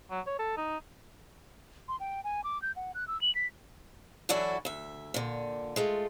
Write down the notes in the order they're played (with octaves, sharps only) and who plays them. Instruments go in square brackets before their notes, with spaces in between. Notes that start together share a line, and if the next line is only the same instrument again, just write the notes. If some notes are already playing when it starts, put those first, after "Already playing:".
[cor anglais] F#3
C#5
A4
D#4
[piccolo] C6
G5
G#5
D6
G6
F#5
F#6
E6
F#7
B6
[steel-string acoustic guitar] E3 F#3 D4 E4 F#4 A4
D2 E5
A#2 D3
G#3 A3 F4